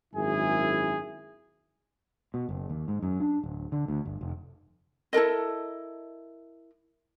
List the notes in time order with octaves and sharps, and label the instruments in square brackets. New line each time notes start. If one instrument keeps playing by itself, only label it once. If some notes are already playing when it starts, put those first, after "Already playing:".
[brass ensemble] G#1 F#2 E4 G#4 G#5
[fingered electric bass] B2
F#1
D#2
G#2
F#2
D4
D1
D3
D2
G1
F1
[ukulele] E4 A4 A#4 D#5